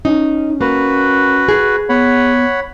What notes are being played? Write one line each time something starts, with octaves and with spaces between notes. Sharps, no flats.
C#4 D#4
A#3 F#4 B4
G#4
B3 C#5 F#5 B5